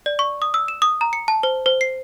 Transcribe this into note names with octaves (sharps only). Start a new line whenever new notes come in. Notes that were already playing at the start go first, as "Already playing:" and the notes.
D5
C#6
D#6
E6
E7
D#6
A#5
C#7
A5
C5
C5
C7